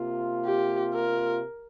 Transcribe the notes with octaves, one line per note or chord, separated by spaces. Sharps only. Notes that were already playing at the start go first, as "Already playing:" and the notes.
Already playing: C3 A#3 F4
G4
A#4